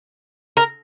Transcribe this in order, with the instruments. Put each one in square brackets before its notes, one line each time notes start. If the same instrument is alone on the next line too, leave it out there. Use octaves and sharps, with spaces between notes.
[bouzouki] A#4